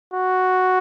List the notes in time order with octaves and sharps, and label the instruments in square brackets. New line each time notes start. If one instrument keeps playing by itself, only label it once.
[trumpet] F#4